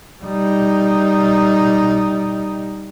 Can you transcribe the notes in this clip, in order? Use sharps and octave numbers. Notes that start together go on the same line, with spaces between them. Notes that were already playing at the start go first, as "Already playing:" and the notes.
G3 D#4